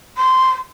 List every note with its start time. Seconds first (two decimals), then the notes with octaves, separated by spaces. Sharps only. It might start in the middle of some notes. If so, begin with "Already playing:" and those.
0.18 C6